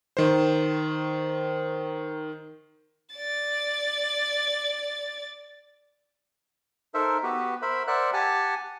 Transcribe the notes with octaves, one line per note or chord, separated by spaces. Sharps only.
D#3 C5
D5 A6
D#4 A4 A#4 C5 E5
B3 F#4 G4 B4
A#4 C5 E5 B5
A#4 C5 D5 E5 F#5 F#6
G4 F#5 G#5 A5